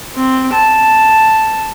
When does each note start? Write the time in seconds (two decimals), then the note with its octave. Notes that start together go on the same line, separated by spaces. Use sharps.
0.16 C4
0.53 A5